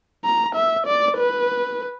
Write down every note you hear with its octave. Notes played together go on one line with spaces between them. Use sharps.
A#5
E5
D5
B4